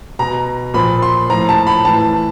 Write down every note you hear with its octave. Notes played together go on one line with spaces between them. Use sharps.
B2 A#5
A#2 F3 B5
C6
A2 F3 A#5
A5
B5
A2 E3 A5